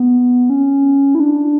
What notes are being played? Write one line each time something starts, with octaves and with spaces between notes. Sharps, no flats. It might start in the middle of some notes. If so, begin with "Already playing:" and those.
Already playing: B3
C#4
E4
D4